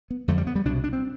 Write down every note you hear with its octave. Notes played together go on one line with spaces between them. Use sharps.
B3
F2 D3 A3
G3
B3
G3
C2 B2 D4
D4
C4